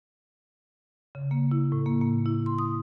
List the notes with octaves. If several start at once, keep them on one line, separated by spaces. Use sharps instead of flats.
C#3
A#3
E4
A2
A#3
A#3
E4
C6
D#6